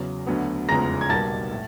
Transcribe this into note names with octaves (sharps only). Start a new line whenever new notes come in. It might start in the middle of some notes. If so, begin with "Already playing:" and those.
Already playing: E2 C#3 F#3
D2 D3 F#3 B3
F1 E2 C#3 F3 G#3 A#5 A#6
G#6
B1 B2 G3 A#3 A5 A6
A2